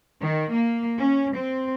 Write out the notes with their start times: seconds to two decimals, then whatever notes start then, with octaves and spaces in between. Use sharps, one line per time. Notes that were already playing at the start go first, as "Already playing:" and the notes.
0.20 D#3
0.53 A#3
0.99 C#4
1.35 C4